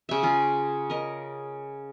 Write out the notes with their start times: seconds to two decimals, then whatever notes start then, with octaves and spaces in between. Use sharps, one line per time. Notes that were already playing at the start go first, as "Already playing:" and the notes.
0.09 C#3 E5
0.23 C#4 F4 G#4
0.90 A#4 D#5